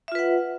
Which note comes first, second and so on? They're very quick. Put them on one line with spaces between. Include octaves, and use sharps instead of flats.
E5 F4 B4 F#5